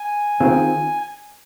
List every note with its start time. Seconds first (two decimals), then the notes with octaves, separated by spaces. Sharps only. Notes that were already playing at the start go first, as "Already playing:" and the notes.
Already playing: G#5
0.40 D#3 C4 F4 G#4